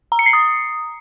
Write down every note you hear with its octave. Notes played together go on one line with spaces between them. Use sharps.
A#5
C#7
C7
D#6